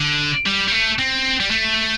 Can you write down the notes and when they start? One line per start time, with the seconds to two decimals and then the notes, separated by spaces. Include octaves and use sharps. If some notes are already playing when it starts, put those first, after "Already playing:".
Already playing: D3
0.46 G3
0.68 G3
0.72 A3
0.99 C4
1.40 G3
1.51 A3